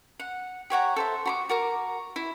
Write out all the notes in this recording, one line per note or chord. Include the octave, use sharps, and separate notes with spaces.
F#5
G4 C#5 F#5 A#5
A4 C5 E5
F#4 B5 D6
F#4 A#4 D6
E4